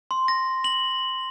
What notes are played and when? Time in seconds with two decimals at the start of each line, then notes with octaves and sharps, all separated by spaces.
0.11 C6
0.28 A#6
0.64 F#7